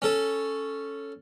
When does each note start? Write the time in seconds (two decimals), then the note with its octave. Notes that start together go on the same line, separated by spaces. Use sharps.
0.02 C#4 A4